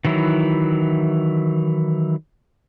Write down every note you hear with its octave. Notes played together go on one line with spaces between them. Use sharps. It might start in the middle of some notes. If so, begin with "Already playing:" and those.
D#3 E3 F#3 E4